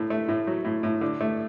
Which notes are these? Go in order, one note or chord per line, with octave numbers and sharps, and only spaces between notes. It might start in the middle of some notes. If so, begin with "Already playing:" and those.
Already playing: A2 A3
A3
A2
F#3
A2
A2
D3
A3